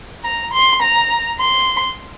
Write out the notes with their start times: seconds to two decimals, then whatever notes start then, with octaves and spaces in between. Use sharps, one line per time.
0.24 A#5
0.53 C6
0.82 A#5
1.40 C6